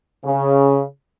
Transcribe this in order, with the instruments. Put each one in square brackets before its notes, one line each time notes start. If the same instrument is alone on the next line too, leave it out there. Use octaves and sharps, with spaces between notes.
[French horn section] C#3